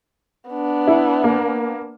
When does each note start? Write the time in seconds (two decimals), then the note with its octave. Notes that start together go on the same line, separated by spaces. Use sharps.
0.49 B3 D4
0.87 E4
1.24 A#3